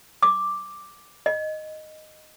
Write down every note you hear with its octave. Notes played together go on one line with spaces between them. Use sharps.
D6
D#5